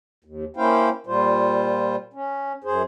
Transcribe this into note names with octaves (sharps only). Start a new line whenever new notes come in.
D#2
A#3 C#4 E4 C5 F5 G5
A#2 G3 F4 C5
C#4
F#2 G#4 C5